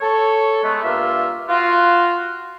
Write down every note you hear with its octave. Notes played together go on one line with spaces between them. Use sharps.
A4 C#5
G#3 A3 B3
G2 A#3 F4 A#4 E5
F4 F#4